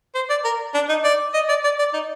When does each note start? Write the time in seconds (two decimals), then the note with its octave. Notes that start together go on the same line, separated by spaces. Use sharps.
0.15 C5
0.30 D5
0.44 A#4
0.74 D4
0.89 D#4
1.04 D5
1.34 D#5
1.49 D5
1.64 D5
1.79 D5
1.93 D#4